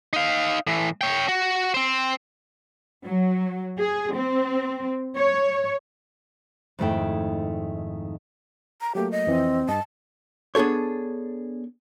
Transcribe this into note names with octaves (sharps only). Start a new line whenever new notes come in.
D#4 F5
A2 E3
C#5 G5
F#4
C4 C5
F#3
G#4
C4
C#5
F2 G#2 D#3 A3 E4 G5
A#5
F#3 A3 A#3 G4
D#5
F2 E3 C4
G2 D#5 A5
B3 D4 G#4 A4 C#5